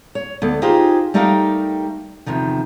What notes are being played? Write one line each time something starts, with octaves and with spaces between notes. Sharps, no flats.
C#5
D2 B3 A4
D#4 F4 G4 G#4 C5
G3 A3 D#4 G4 A#4 F5
E2 C3 D#3 F3